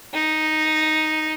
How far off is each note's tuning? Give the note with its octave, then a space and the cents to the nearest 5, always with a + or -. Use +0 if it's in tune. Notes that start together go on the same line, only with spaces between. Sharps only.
D#4 +0